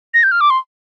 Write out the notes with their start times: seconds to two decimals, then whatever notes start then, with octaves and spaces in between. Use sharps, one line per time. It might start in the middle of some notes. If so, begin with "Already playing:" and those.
0.14 A#6
0.23 G6
0.32 F6
0.41 D6
0.50 C6